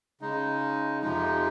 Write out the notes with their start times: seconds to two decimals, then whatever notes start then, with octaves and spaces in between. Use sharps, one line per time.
0.21 C#3 G#3 D#4
1.02 F2 C3 F3 G#3 D#4